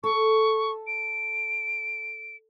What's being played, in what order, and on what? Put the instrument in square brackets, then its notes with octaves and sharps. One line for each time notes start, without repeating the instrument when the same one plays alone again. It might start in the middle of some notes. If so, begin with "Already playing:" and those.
[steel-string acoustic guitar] A4 [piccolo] C#6
[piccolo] D7